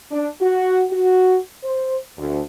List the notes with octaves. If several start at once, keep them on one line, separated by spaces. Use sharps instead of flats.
D4
F#4
F#4
C5
D2